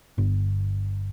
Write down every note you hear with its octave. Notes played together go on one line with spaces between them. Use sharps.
G1